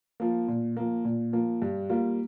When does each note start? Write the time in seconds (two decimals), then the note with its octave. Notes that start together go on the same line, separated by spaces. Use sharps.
0.20 F3 A#3
0.48 A#2
0.77 F3 A#3
1.05 A#2
1.33 F3 A#3
1.62 G2
1.89 G3 A#3 F4